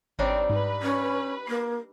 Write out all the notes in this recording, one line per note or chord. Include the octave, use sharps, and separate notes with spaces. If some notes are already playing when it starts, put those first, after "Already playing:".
G#1 G3 C4 D4 D#4 C#5
G#2 B4
C#4
A#3 C7